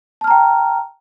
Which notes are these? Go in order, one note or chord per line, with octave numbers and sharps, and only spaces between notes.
G5 A5 A#5 F6